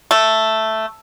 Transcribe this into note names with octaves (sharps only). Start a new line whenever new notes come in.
A3